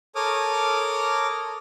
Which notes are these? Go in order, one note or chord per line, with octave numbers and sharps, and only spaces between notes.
A4 A#4 C#5 D6 D#6 F6